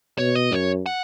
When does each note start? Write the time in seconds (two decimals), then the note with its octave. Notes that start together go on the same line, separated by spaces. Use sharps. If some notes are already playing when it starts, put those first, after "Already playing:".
0.18 B2 C#5
0.35 D#5
0.52 F#2 C#5
0.86 F#5